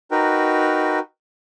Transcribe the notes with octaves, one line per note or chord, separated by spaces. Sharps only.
D#4 F#4 A#4 B4 G5